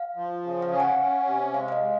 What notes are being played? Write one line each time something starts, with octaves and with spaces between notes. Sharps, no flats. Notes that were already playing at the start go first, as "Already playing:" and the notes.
Already playing: F5
F3
C#3
F5
C#4
F#5
C#4
C3
G#3 F5
F5
D#5
G#3